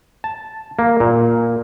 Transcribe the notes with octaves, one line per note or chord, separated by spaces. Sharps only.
A5
A#3
A#2